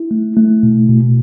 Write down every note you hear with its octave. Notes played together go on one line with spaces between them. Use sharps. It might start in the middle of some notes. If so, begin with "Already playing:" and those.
Already playing: E4
A3
A3
B2
B2